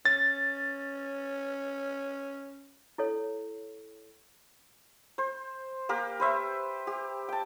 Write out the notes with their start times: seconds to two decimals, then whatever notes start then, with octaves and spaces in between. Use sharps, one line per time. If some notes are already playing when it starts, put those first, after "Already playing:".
0.05 C#4 A6
2.98 E4 A4 C#5
5.18 C5
5.89 A#3 G4 A#4
6.20 B4 C5 E5
6.87 G4
7.29 G5 A5